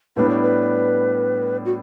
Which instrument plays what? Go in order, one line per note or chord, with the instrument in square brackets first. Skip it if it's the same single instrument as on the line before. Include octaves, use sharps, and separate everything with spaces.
[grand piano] A2 G3 B3 D4 [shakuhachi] B4
[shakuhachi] C#5
B4
F#4